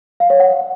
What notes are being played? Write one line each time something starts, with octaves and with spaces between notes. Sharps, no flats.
F5
C#5
F#5